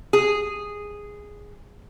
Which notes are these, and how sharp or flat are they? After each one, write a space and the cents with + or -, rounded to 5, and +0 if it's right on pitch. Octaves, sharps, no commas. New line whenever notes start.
G#4 -5